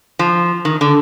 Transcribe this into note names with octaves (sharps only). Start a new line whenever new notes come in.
F3
D#3
D3